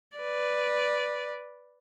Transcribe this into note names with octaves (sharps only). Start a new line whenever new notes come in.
B4 D5